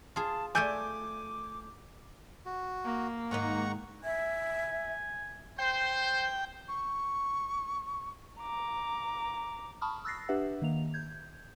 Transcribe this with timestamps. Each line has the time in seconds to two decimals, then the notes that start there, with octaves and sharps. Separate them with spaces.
0.16 F4 G#4 A5
0.55 A3 A4 D5 G#5 D6 G6
2.46 F#4
2.84 A#3
3.31 G#2 D#3 D#4 F#5 A#5 C#6
4.04 E5 G#5
5.59 C5 G5
6.68 C#6
8.40 A#5 D6
9.81 A5 B5 C#6 D#6 F6
10.05 E6 F#6 A6 A#6 C7
10.29 D4 G4 B4 E5 F#5
10.62 D#3 A#3 F7
10.94 G6 G#6